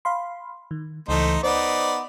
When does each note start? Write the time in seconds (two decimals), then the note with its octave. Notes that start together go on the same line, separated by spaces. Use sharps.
0.05 F5 B5 C6
0.71 D#3
1.08 C#2 E3 A3 D#4 C5
1.43 B3 D#4 C5 D5